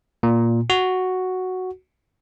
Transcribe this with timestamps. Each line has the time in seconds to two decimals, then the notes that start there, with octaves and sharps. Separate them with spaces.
0.23 A#2
0.70 F#4